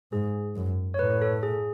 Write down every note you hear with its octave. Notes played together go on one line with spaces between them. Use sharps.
G#2 G#4
F#2
C#5
A2 B4
A4
G#4